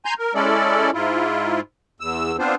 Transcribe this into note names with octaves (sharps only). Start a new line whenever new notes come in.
G#5 A#5 C6 G6
A#4
G#3 C#4 E4 A4 D5
G#2 E4 F4
E2 E6
B3 C4 D4 F4 C5